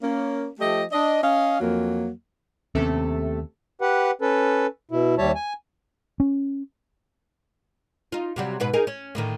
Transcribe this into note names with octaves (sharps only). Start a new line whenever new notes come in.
A#3 C#4
F3 A3 G4 D#5
D4 D#5
C#4 D#5 F5
F2 F#3 A#3
D#2 C3 A3 B3 C#4 A4
G4 B4 F#5
C#4 A4 B4
B2 E4
D#2 G3 C#5 E5 A5
G#5
C#4
D#4 F4
C3 F#3 G3
G#2 B2 B4
D#4 G#4 A#4
C#4
A2 D3 D#3